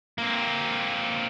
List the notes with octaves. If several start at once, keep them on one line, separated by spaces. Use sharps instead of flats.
A#3 C4